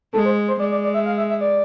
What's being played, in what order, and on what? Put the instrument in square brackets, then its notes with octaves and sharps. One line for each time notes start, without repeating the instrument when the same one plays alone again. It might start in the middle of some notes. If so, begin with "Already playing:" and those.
[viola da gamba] G#3 [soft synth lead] A4
[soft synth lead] C5
C5
[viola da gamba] G#3 [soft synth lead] D5
[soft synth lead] D5
D5
E5
F5
E5
E5
D5